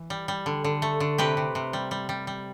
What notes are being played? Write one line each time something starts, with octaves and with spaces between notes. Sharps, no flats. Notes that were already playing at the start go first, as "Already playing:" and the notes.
Already playing: E3
G3
G3
D3
D3
A3
D3
C3 G4 B4
C3
C3
G3
G3
G3
G3